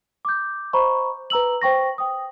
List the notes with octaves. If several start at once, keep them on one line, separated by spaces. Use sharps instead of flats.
D6 G6
C5 D#5 A#5 B5 C#6
B4 A#5 E6 F#7
C5 G5 C#6 A#6
G5 D#6